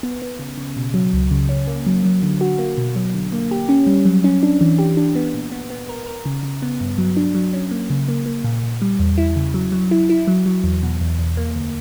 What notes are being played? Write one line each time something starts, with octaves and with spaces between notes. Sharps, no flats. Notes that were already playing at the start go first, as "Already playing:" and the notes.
B3
B3
C#3
C#3
B2
F#3
C#2
C#3
C#4
A#3
F#3
F#3
D3
F#4
A#3
B2
F#3
D3
A#3
G4
C#4
G3
F#3
C#4
D4
E3
G4
D4
B3
A#2
B3
B3
A#4
A#4
C#3
C#3
B3
G2
F#3
D4
F#3
C#4
A#3
C#3
A#3
A#3
A#2
A#2
G3
E2
E4
C#3
F#3
F#3
E4
E4
F#3
F#3
E2
B2
E2
E2
A#3
D2